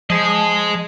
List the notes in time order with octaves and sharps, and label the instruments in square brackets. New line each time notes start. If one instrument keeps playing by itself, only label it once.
[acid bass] F3 [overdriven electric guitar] G#4 D#5